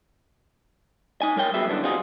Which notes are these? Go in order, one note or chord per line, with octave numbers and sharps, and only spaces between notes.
D#4 G#5
G3 A#4 C#5 F#5 G5
G3 B3 F#4 G#4 B4 E5
F#2 D3 E3 B3 D4
G3 C4 D#4 F4 F#4 G#4